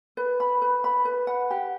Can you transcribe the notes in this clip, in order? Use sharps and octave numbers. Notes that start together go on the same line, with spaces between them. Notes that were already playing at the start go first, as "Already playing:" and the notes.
B4
B5
B4
B5
B4
F#5
G4